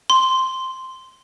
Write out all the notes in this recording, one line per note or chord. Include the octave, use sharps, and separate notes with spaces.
C6